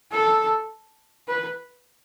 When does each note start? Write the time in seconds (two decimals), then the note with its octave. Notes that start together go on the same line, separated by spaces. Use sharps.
0.12 A4
1.28 B4